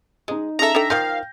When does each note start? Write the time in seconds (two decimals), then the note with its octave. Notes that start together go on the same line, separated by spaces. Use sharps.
0.28 G#3 D#4 D#5
0.59 C#3 A4 E5 A#5
0.75 D4 A4 G5
0.90 D#3 F3 F5 G5 G6 A#6